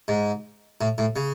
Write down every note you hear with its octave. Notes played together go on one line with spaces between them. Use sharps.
G#2
A2
A2
C#3